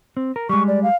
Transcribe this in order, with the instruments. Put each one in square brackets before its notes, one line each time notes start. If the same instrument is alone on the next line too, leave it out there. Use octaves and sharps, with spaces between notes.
[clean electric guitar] C4
A#4
[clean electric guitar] G3 G#3 [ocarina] C#6
[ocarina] D5
F5